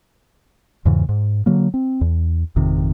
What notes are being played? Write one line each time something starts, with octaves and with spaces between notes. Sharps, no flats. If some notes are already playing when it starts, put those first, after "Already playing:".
E2 G#2 C#3 E3
G#2
D3 F#3 A#3
C4
E2
G#1 F2 C3 D#3